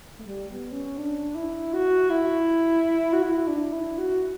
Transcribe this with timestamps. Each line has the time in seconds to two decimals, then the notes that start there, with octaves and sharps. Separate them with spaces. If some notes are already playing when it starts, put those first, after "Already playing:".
0.19 A3
0.22 G3
0.47 B3
0.72 C#4
0.98 D4
1.35 E4
1.73 F#4
2.10 E4
3.13 F#4
3.23 E4
3.48 D4
3.73 E4
3.98 F#4